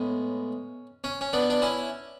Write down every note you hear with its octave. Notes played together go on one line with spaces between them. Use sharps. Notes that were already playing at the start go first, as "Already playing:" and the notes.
Already playing: A2 G#3 B3 C#4
C#4
C#4
B3 D4
D4
C#4 E4